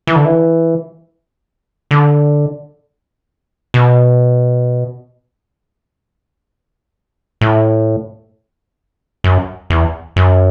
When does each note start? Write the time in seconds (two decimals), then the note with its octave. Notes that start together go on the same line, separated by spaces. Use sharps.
0.07 E3
0.16 D3
0.25 E3
1.91 D3
3.74 B2
7.41 A2
9.24 F#2
9.70 E2
10.16 F#2